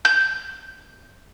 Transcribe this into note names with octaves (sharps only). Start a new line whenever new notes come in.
G6